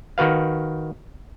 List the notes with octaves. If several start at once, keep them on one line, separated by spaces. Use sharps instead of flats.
D#3 F#4 B4 F5